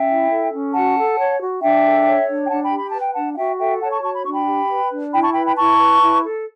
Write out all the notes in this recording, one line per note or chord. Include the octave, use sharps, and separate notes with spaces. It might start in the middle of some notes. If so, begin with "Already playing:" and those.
Already playing: C#4 E5 G5
E4
A4
C#4
F#4 F#5 A5
A4
C#5
F#4
D4 E5 G5
A4
C#5
D4
G5
D4 F#5 A5
G5 B5
G4
B5
B4 A5
G5
D4 F#5 A5
F#5
F#4 E5 G5
A4 E5 G5
C#5 F#5 A5
A5 C#6
F#4 A5 C#6
B5
D4 C#6
G5 B5
G4
B4
D4
E4 G5 B5
A5 C#6
B4 G5 B5
G5 B5
E4 A5 C#6
B4
E4
A4